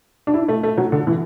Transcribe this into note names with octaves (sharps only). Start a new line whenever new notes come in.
D4
E4
A3
A3
F#3
D3
E3